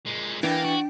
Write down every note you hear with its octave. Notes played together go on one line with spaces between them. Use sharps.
A#2 G#3
E3 A#3 D4 G5
F#4